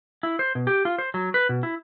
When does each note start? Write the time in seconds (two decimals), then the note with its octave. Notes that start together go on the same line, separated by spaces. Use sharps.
0.23 E4
0.39 C5
0.55 B2
0.67 G4
0.85 F4
0.98 C5
1.14 F#3
1.34 B4
1.49 B2
1.63 E4